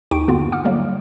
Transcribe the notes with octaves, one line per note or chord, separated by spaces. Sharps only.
D#2 D#4 G4 G5 C#6 D7
G2 D3 A#3 B3 F4 F#4
F#5 D6 F6
D3 F#3 G3 A#3